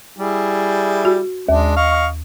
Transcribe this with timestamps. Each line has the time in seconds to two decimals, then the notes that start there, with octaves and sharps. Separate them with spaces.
0.18 G3 E4 G#4
1.05 F#4
1.49 D#2 G#3 D4
1.77 D#5 F5 C#6